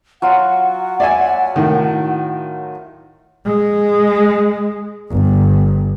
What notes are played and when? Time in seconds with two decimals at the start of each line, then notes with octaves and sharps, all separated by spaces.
0.22 F#3 F4 F#4 F#5
1.00 D5 E5 G#5
1.56 A2 D#3
3.45 G#3
5.10 G1